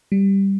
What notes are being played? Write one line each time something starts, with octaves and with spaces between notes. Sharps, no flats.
G3